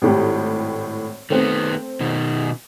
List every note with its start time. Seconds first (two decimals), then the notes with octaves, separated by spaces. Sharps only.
0.02 G#1 A2 G4
1.30 D#3 A3 B3 C4
2.01 B2 D#3